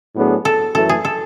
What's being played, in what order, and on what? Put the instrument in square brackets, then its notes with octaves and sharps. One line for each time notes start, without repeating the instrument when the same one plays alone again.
[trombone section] A2 F#3 B3 D4 G#4
[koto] A4
[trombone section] F#2 E3 A3 [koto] A4
[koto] G#4
A4